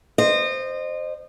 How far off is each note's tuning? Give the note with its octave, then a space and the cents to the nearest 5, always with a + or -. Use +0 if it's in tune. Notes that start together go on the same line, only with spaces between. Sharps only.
C5 +0 D#5 -30